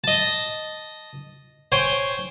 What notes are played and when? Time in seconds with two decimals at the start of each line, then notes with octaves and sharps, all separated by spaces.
0.04 D#5 A5
1.72 C5 C#5 G5 G#5